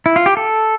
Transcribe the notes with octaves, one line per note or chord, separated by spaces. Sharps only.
E4
F4
G4
A4